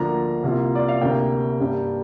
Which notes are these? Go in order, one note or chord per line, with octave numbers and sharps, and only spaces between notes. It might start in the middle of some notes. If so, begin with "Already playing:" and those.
Already playing: D2 D3 F3 A#3 D4 A#5
C2 C3 A#3 F4
D5
F5
D2 C3 A#3 D4 G5
G2 G3 A#3